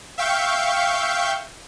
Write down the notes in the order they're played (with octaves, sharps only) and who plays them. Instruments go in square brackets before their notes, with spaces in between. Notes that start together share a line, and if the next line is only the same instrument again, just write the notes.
[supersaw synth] E5 F5 G5 C#6 G6